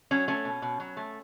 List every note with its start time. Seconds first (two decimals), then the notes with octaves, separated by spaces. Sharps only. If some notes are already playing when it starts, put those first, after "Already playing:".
0.11 F#3 C#4
0.28 A3 C#4
0.45 B2
0.62 B2
0.80 F#3
0.97 A3